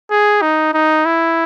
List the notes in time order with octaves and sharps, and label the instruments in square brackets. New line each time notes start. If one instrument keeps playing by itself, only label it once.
[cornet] G#4
D#4
D#4
E4